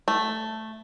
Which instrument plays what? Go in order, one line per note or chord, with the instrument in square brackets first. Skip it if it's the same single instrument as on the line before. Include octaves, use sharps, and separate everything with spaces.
[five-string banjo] A3